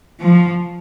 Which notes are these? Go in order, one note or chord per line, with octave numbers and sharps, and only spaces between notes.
F3